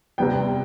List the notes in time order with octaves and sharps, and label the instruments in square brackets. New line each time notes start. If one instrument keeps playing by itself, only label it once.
[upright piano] C3 G3 B3 G5